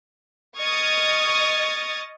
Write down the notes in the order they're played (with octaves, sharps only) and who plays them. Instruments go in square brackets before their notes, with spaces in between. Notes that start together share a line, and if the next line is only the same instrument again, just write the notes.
[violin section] D#5 C#6 D#6 F6 G#6 A6